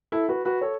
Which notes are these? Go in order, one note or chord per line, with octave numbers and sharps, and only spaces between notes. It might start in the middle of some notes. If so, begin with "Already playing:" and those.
E4 A4
F#4 B4
F#4 B4
A4 C#5